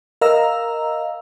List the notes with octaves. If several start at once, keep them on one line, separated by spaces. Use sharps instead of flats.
A#4 D#5 F5 A#5 E6